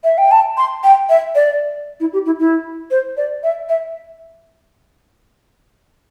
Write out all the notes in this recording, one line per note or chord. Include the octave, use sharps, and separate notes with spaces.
E5
G5
A5
C6
G5
E5
D5
E4
G4
E4
E4
C5
D5
E5
E5